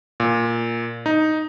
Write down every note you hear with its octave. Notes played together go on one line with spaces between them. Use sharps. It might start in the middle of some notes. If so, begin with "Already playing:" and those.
A#2
D#4